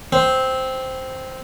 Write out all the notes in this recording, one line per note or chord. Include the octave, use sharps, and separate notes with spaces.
C4